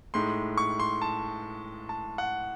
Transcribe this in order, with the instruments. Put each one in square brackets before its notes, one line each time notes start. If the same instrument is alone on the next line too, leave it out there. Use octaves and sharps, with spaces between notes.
[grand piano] A2 G#3 D#4 C6
C#6
C6
A5
A5
F#5